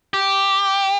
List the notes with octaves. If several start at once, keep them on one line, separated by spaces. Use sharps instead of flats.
G4